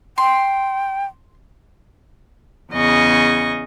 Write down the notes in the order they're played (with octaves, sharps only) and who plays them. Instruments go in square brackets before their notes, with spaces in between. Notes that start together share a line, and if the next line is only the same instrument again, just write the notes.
[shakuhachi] G5 [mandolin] C6
[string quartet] E2 C#3 D#5 C#6